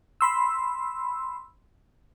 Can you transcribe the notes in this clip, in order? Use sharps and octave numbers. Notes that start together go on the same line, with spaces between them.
B5 C6 E6